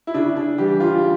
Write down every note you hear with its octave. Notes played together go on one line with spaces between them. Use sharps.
E4
C#3 D4
D4
E3 G3 G4
F4
C#3